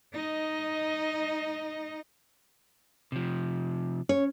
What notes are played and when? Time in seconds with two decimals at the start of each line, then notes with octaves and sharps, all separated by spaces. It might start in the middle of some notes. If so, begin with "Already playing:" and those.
0.13 D#4 D#5
3.12 C3 F3
4.09 C#4 C#5